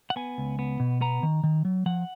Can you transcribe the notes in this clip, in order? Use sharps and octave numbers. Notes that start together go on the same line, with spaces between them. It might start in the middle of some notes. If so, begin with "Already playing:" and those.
F#5
B3 G#5
C#2
B3
B2
B3 A#5
D#3
D#3
F#3
F3 F#5